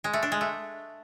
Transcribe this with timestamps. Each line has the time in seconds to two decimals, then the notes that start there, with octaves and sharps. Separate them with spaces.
0.04 G#3
0.13 A3
0.23 D4
0.32 G#3
0.41 A3